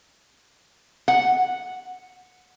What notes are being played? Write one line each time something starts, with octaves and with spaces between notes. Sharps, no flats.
F#5